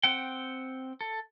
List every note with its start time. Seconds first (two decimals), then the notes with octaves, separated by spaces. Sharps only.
0.03 C4 F#5 G5
1.01 A4